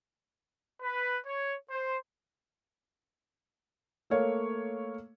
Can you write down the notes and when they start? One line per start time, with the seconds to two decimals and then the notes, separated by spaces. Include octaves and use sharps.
0.82 B4
1.26 C#5
1.70 C5
4.10 A3 A#3 C#5 F5